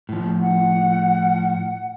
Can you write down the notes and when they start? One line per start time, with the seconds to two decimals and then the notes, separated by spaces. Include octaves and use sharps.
0.09 A2 F3
0.40 F#5